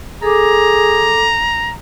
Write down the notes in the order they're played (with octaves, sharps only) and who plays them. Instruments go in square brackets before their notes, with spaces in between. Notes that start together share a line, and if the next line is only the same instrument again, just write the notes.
[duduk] G#4 [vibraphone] A4 D6 [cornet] A#5